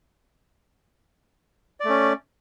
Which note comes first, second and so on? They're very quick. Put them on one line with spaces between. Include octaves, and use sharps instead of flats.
D5 A3 C#4